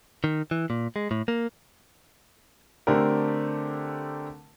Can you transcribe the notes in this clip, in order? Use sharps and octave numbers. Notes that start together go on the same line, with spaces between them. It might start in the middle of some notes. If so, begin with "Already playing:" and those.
D#3
E3
A#2
G#3
A2
A#3
D3 A3 C4 D4 G4 A#4